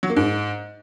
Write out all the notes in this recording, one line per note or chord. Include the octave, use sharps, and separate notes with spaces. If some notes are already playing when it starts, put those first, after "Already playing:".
F#3
A#3
G#2